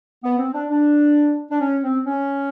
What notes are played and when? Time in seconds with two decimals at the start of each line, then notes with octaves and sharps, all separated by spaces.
0.24 B3
0.38 C4
0.54 D4
0.70 D4
1.51 D4
1.61 C#4
1.83 C4
2.06 C#4